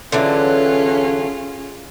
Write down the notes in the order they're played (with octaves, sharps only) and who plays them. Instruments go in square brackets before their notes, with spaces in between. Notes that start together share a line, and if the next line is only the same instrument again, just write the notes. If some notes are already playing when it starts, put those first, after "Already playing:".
[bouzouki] D3 E3 F#3 [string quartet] C#4 F4 G#4